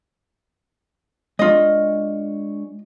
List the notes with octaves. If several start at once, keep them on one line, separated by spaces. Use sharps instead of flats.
G#3 D4 F4 C#5 D#5